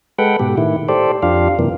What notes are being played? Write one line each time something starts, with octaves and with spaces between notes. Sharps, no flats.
G#3 A4 B4 F#5 G5
G#2 B2 G4
A2 D#3 E4
G4 A4 C5 D5
F2 D4 F4 G4 F5
F#2 C3 E3 A#3